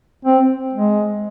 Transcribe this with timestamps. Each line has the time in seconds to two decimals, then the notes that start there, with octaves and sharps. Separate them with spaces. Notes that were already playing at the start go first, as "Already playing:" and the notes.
0.25 C4
0.73 G#3